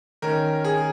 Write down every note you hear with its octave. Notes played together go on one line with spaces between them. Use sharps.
D#3 C#4 A#4
G#4